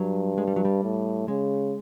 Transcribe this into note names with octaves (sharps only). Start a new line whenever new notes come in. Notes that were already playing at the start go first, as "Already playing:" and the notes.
Already playing: G2 F#3
G#3
G3
F#3
G3
A2
C#3 G#3